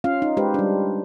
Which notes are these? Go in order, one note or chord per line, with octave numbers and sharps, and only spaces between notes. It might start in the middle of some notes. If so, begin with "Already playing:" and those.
C#4 F4 F5
D#4
G#3 G4 B4 C5
G3 D4